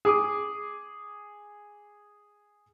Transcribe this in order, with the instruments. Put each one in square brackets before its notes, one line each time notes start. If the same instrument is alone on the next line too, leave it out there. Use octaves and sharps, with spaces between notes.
[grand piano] G#4 D6 D#6